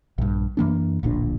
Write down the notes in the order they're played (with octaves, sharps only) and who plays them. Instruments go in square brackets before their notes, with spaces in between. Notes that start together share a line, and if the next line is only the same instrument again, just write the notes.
[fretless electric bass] A#1 G2
F#2 E3 A#3 D4
D1 A#1 A#2 D4